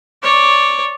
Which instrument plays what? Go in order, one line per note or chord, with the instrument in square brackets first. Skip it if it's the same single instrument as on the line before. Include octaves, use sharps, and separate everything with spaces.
[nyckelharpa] C#5 D5